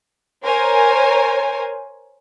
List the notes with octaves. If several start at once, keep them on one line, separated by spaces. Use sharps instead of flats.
A#4 C5 C#5 G#5